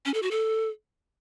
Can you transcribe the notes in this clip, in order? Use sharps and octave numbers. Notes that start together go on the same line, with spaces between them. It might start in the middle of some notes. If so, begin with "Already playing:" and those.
C#4
A4
F#4
A4